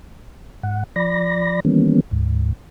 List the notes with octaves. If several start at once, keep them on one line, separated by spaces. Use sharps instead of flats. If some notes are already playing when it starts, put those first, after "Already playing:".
G#2 F#5
F3 D5 B5 A#6
D#3 E3 G3 A#3 B3 C#4
D2 G#2